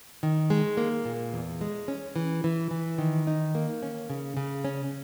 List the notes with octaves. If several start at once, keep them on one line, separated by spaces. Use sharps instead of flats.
D#3
G#3
A#3
A#2
E2
G#3
C#4
E3
E3
E3
D#3
D#4
A#3
C#4
C#3
C#3
C#4